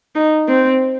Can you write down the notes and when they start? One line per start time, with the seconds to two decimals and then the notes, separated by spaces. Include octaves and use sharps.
0.15 D#4
0.48 C4